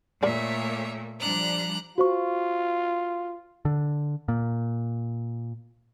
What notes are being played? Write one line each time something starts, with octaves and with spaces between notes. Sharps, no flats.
A#2 A3 A#3 A#4 C#5 D5 E5
F3 G3 D4 A#5 F#6
F4 F#4 C5 C#6
D3
A#2